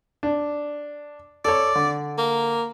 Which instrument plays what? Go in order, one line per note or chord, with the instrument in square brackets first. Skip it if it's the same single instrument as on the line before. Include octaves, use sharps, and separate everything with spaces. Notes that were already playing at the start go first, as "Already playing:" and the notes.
[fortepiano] D4
[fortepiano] A4 C#5 [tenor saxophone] D5
[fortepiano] D3
[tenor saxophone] A#3